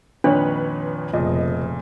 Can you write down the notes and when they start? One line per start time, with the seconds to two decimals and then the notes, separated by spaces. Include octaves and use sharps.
0.24 F2 A#2 D#3 D4 B4 C#5
1.13 F1 A#2 C#3 F3 D#5